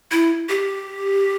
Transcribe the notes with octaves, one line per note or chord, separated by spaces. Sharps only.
E4
G4